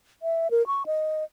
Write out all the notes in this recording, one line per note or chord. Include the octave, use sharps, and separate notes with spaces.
E5
A#4
C#6
D#5